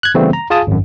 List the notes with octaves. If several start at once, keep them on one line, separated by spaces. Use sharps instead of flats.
F#6 G#6
C#3 E3 G3 A3 B3 C4
A#5
F4 G#4 F5 G#5 A5 D#6
G#1 F#2